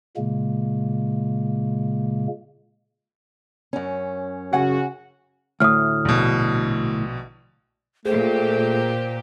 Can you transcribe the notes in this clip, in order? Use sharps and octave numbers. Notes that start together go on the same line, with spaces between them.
A#2 C#3 G#3 A#3
F#2 C#4
C#3 F#4 F#5 G#5
D2 A2 D#6 F6
A#1 B2
A#2 A3 G4 G#4 C5